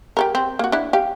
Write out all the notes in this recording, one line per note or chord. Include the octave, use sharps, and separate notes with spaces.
G4 A4 A#4
C4
A#3 F#4
D4 E4
G4 F5